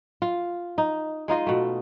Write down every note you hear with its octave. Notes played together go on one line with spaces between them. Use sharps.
F4
D#4
G#3 D#4 F4 D#5
B2 A3